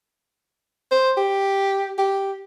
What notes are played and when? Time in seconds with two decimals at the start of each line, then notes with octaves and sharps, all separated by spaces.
0.91 C5
1.17 G4
1.98 G4